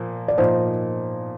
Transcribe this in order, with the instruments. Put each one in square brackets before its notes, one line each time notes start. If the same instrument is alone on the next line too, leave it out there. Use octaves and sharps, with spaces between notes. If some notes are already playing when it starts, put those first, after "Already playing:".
Already playing: [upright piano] A#2 F3 A#3
[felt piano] D5
[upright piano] A#2 F3 A#3 D#4 [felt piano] C5